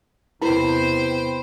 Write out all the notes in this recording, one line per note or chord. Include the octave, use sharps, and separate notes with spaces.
E2 C3 E4 B4 C5 G5